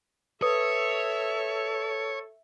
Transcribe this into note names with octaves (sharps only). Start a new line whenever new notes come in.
A4 B4 C#5 E5 D#6